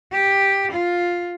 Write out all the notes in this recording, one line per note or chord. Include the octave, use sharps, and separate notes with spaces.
G4
F4